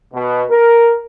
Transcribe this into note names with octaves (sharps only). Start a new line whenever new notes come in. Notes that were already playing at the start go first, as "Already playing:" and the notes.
B2
A#4